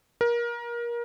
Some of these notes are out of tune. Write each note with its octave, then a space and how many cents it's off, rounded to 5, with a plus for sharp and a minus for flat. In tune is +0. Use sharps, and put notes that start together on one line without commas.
A#4 +25